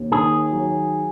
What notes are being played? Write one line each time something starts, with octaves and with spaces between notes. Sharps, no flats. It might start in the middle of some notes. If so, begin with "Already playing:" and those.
Already playing: D#2
D#3 G#4
F#3